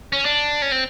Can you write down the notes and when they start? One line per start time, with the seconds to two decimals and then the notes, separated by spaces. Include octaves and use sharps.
0.13 C#4
0.25 D4
0.62 C#4
0.72 C4